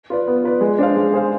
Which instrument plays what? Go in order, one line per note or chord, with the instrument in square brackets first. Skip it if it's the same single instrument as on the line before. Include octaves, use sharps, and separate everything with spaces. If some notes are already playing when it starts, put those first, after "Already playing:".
[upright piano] F4 B4 D5
B3
F4 B4 D5
G#3
D4 G#4 C5 F5
G#3
D4 G#4 C5 F5